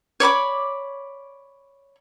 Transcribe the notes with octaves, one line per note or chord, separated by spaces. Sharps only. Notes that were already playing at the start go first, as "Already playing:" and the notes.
C#5 D5 B5 D6